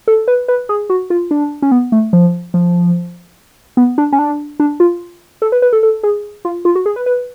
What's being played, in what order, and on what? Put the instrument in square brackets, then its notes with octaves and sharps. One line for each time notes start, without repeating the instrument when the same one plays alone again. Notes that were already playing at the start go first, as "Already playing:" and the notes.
[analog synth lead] A4
B4
B4
G#4
F#4
F4
D4
C#4
B3
A3
F3
F3
B3
D4
C#4
D4
D4
F4
A4
B4
B4
A4
A4
G#4
F4
F4
F#4
G#4
B4
B4